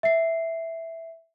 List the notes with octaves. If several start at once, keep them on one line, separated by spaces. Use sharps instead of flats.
E5 C7